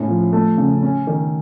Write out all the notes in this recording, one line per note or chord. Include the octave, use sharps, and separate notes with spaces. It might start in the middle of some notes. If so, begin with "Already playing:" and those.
Already playing: A2 C#4
F3
A3
C#3
C#4
D#3